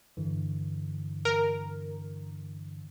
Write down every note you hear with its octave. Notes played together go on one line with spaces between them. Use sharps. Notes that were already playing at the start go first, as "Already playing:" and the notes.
G2 D3 E3
A#4